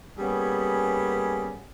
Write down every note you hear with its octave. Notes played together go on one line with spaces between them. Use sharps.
G3 A#3 B3 C#4 G#4